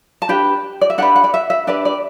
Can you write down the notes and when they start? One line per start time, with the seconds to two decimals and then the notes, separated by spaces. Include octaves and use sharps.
0.22 A5
0.29 D4 G4 B4 G5
0.81 D5
0.90 E5
0.98 D4 G4 B4 F#5
1.16 F#5
1.24 D5
1.34 E5
1.50 E5
1.67 D4 G4 B4 D5
1.85 D5